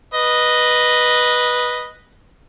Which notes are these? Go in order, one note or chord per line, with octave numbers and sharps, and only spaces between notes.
B4 D#5